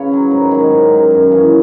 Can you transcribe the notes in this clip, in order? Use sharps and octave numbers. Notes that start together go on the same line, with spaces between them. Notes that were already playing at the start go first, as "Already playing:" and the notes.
Already playing: C#3 B4 C#5
F#3 C#4
G#2 A#4
D#3 F#3
G#2
D#3 F#3
F#2
E3 A#3 C#4